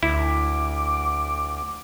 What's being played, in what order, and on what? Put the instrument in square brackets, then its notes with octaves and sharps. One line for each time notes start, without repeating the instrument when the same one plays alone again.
[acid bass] D2 [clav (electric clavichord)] E4 [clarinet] D6